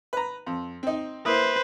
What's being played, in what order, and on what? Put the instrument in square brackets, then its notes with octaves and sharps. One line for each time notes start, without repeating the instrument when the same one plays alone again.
[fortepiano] B4 A#5
F2
C4 D#4
[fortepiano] A#3 E4 D#6 [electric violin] B4 C5